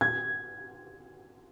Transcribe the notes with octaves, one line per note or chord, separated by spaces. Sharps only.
G#6